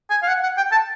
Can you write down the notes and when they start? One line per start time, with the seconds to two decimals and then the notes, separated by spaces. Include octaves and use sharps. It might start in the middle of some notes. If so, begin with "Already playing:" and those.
0.10 G#5
0.23 F5
0.28 F#5
0.43 F#5
0.57 G5
0.72 A5